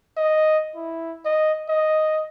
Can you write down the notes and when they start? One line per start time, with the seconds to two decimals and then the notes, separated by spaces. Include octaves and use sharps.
0.17 D#5
0.75 E4
1.25 D#5
1.68 D#5